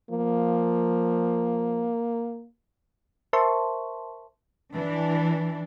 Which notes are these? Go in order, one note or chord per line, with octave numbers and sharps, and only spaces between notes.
F3 A#3
A#4 C5 E5 A5 C6 C#6
E3 D4